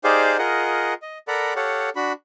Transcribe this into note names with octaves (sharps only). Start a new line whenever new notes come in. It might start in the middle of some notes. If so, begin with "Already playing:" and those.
D#4 G4 G#4 C5 D5 F5
F4 G#4 A#4 D#5 F#5
D#5
A4 A#4 D5 F#5 A#5 B5
G4 A4 C#5 F5 F#5
D4 F#4 B5